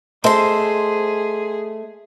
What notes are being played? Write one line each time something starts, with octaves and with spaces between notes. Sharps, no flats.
A3 G#4 C5 D#5 C6